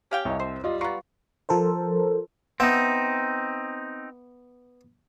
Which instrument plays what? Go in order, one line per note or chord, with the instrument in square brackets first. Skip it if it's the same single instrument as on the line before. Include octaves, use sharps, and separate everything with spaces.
[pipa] C#4 F5 G5 [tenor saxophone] G4
[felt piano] C2 D#5 [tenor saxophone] C#5
[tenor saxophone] C4 [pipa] C5
[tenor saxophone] G3 [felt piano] F4 D#5
[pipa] B3 F4 [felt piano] A#5 C#6
[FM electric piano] F3 A4 A#4 C5
[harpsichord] B3 E5 [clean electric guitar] C4 D#4